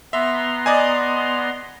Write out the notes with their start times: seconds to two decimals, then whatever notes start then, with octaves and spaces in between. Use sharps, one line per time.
0.13 B3 E5 A#5 C6
0.66 D5 D#5 G#5